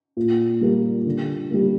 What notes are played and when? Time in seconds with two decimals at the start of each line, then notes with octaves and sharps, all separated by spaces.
0.17 A#2
0.61 G3 A#3
1.06 D3
1.51 G3 A#3